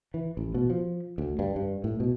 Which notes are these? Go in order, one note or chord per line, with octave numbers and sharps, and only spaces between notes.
E3
A1
B2
F3
D2
G2
G2
A2
B2